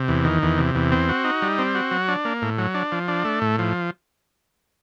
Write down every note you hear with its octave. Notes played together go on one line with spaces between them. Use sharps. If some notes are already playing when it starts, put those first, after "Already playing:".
Already playing: C3
E2
D#3
E2
C3
E2
C4
F#4
D#4
G3
C4
F#4
F#3
D4
A#3
A2
F#3
D4
F3
D4
A3
A2
F3